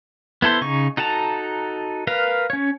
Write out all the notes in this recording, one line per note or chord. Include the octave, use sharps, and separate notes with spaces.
B3 E4 A4 C5
C#3 D#4 C#6
D#4 F#4 A4 A5 A#5
A#4 B4 F5
C#4 C#5